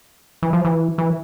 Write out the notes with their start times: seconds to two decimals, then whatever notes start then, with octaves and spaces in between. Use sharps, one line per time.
0.43 E3
0.53 F3
0.65 E3
0.98 E3